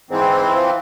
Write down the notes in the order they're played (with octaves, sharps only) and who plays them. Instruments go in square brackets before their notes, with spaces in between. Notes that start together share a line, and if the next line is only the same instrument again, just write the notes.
[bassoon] G#2 [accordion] E3 C4
[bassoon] F3